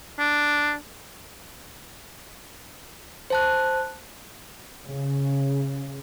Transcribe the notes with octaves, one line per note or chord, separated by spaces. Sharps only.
D4
C5 A5 F#6
C#3